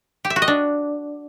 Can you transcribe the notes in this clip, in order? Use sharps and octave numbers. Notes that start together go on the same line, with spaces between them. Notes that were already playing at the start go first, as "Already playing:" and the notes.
G4
E5
F#4
D#5
D4